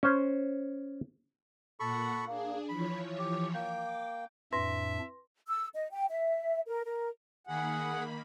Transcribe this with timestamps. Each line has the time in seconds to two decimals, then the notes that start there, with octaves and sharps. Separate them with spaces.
0.03 C#4 C5
1.80 A#2 A4 F#5 B5 C#6
2.27 A#3 D4 G#4
2.69 E3 F3 C#5 B5
3.19 G4
3.54 A#3 G5 D6
4.53 F2 A2 D4 B4 E5 C6 A#6
5.48 E6
5.75 D#5
5.93 G5
6.10 E5
6.66 A#4
6.85 A#4
7.47 D#3 A#3 G#4 F#5 B5